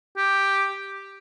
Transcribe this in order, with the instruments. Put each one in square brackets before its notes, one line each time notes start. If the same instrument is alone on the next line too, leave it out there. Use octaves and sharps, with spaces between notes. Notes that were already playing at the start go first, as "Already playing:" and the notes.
[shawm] G4